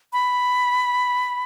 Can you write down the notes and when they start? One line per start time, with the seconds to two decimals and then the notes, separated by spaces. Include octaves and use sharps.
0.13 B5